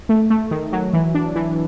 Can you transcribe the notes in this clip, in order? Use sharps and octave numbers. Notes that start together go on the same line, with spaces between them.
A3
A3
D#3
F#3
E3
D4
E3